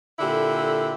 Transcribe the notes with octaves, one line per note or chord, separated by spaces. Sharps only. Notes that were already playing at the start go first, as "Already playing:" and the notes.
A#2 D3 E4 G4 A4